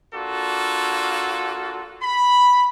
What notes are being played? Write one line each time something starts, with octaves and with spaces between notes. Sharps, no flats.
A#3 D4 F4 F#4 A4
B5